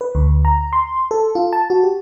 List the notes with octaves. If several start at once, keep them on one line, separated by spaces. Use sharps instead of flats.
B4
D2
A#5
C6
A4
F4
A5
F#4
G4